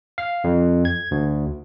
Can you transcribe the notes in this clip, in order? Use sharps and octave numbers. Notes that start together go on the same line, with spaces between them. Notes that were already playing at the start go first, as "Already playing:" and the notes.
F5
F2
G#6
D2